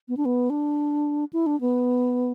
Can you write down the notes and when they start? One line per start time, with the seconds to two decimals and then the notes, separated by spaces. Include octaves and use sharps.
0.09 B3
0.17 D4
0.25 B3
0.50 D4
1.33 E4
1.46 D4
1.61 B3